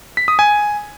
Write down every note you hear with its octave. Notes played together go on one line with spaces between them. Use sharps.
B6
D#6
G#5